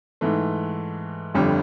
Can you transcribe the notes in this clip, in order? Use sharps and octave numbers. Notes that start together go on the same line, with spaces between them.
G#2 E3 A3
G1 F2 D3 G3